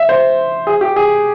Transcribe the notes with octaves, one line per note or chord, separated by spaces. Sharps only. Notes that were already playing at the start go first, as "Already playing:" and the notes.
Already playing: E5
C5
G#4
G4
G#4